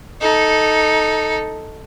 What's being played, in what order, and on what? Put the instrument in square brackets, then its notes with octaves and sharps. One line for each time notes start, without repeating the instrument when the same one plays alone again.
[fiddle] D#4 A4